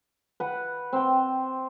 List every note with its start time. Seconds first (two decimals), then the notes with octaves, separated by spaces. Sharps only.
0.40 B4 F#5 B5
0.93 C4 G5